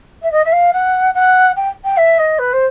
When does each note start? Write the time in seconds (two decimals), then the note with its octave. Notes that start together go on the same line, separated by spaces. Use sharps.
0.22 E5
0.31 D#5
0.44 E5
0.52 F5
0.73 F#5
1.14 F#5
1.56 G5
1.84 G5
1.97 E5
2.18 D#5
2.38 B4
2.52 C5